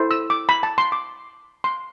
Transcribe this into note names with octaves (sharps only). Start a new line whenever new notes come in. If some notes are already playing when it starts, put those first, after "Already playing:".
Already playing: E4 A4 C5
E6
D6
B5
A5
C6
D6
C6